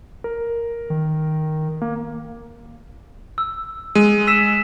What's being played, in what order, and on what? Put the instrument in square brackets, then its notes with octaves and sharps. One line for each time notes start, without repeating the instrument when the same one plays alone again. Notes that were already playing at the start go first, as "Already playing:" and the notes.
[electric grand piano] A#4
[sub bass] D#3
[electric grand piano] A#3
[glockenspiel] E6
[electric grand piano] G#3 [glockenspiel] D#7
[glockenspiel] E6 B6 E7